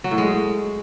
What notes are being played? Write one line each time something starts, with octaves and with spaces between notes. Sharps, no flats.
F#3
A2
G#3